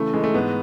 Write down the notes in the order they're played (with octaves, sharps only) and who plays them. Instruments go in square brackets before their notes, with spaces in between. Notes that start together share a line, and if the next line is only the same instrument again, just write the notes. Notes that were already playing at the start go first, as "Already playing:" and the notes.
Already playing: [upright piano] C#3 E3 A3
E3 G#3
A3
G#2 B3